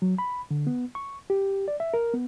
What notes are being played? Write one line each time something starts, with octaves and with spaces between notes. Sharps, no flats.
F#3
B5
D3
B3
C#6
G4
D5
E5
A#4
B3